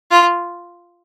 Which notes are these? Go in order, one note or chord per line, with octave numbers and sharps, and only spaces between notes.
F4